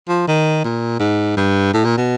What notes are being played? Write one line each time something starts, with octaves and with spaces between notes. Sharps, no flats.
F3
D#3
A#2
G#2
G2
A2
A#2
B2